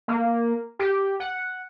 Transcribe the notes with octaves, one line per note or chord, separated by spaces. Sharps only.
A#3
G4
F#5